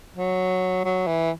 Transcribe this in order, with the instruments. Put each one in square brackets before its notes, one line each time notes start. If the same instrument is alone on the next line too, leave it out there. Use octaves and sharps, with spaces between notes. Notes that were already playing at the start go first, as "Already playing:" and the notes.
[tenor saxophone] F#3
F#3
E3